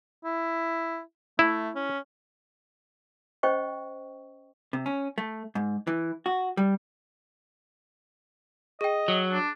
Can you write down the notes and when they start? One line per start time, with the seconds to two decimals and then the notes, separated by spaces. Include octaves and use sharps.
0.24 E4
1.39 A3 E4
1.76 C#4
3.43 C#4 C5 D#5 G5 C#6
4.73 C3
4.86 C#4
5.18 A3
5.55 G#2
5.87 E3
6.26 F#4
6.57 G3
8.81 G#4 D#5 G5
9.08 F#3
9.32 D4